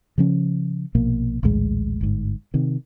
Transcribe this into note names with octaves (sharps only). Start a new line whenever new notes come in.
C#3 F3 C#4
A#1 B2 A#3
A#1 D#2 A2 G#3
G1 G#2
C3 D#3